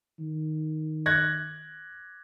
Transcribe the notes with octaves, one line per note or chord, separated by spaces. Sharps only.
D#3
F#6 G#6 A#6